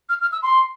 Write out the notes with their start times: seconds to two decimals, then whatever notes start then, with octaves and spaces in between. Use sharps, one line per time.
0.09 F6
0.21 F6
0.32 E6
0.43 C6